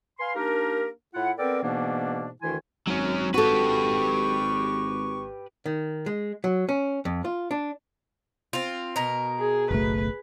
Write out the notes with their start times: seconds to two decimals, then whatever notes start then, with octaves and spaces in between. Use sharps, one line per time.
0.19 B4 F5 G#5 C6
0.36 A#3 D4 D#4 G4 A#4
1.14 A2 E4 F4 F#5
1.38 B3 C4 A4 A#4 D5 G5
1.63 G#2 B2 E3 A#3 B3 D4
2.42 D2 D#3 E3 E4 G#5 C6
2.87 G#1 F#3 C#4
3.34 F#4 G4 A4 B4 C#6
5.66 D#3
6.06 G#3
6.44 F#3
6.69 C#4
7.05 F2
7.25 F4
7.51 D4
8.53 C4 F4
8.96 B2 A#4
9.39 G#4
9.71 F#1 B1 A3 B4